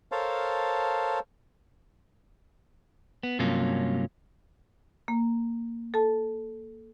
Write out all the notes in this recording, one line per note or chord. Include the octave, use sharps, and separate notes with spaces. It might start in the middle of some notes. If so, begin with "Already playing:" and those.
A4 A#4 C5 C#5 F5 A5
B3
G2 C3 F#3 A#3 C#4 F4
A#3
A4 A5